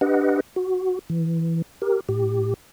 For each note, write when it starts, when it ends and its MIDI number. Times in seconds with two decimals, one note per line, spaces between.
0.01 0.40 62
0.01 0.40 67
0.01 0.40 71
0.01 0.40 75
0.01 0.40 78
0.56 0.99 66
1.10 1.62 52
1.82 2.00 67
1.82 2.00 70
2.09 2.54 45
2.09 2.54 67